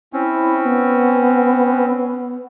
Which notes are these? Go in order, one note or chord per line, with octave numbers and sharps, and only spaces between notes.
C4 C#4 E4
B3